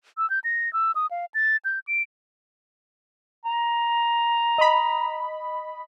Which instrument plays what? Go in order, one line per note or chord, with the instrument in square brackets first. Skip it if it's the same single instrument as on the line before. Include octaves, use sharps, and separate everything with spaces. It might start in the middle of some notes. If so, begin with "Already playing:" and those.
[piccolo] E6
G6
A#6
E6
D#6
F5
A6
G6
D7
[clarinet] A#5
[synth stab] D#5 B5